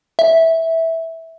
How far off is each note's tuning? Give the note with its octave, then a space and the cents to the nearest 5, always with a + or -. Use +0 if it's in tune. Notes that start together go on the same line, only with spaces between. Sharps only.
E5 -10